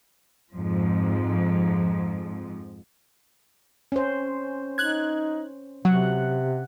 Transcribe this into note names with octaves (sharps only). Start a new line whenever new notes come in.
F2 G#2 F3
C#4 C5
D#4 F#6 G#6
C3 F#3 F#5